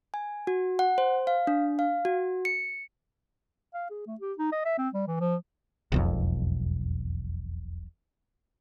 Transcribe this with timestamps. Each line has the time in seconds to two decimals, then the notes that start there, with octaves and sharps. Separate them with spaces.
0.14 G#5
0.47 F#4
0.79 F#5
0.98 C5
1.27 F5
1.47 D4
1.79 F5
2.05 F#4
2.45 C#7
3.74 F5
3.90 G#4
4.07 A3
4.20 G4
4.38 D#4
4.52 D#5
4.65 E5
4.78 C4
4.94 G3
5.07 E3
5.20 F3
5.92 E1 B1 F2